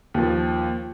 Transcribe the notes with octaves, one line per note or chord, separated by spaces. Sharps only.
D#2 F3